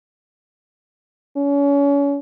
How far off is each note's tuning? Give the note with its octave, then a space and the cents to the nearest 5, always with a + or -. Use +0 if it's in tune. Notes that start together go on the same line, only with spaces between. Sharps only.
C#4 +35